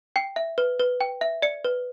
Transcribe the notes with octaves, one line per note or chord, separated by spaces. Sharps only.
G5 C7
E5
B4
B4
G5
E5
D5 C#7
B4